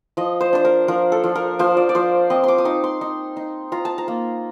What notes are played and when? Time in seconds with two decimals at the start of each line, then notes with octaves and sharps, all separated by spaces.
0.17 F3 D#5
0.41 C5
0.53 D4 C5
0.65 A#4
0.88 F3 A#4
1.12 A4
1.24 F3
1.35 A#4
1.59 F3 C5
1.77 D5
1.89 D5
1.95 F3 C5
2.30 C4 D#5
2.44 C6 D6
2.58 D#6
2.65 D#4 D6
2.84 C6
3.01 D#4
3.37 D#4
3.72 F4 A#5
3.85 A5
3.98 A#5
4.08 A#3